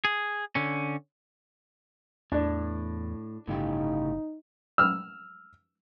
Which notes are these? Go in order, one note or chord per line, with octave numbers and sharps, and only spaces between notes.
G#4
D3 C#4
E2 A2 D4
G1 A2 C#3 D#4 G4
E6 F6